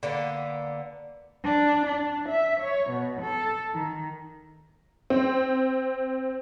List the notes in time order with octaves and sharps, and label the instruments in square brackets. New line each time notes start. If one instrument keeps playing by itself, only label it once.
[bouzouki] D3 A#3 B3
[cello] D4
D4
E5
C#5
B2
A4
D#3
[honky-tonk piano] C4